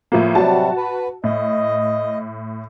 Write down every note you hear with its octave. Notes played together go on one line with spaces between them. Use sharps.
A2 F3 A#3
C3 F#3 G3 F#4 A5
B4
A2 D#5